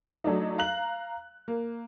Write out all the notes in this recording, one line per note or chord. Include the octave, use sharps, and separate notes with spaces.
F#3 A3 D4 D#4
F5 A#5 F#6 F#7
A#3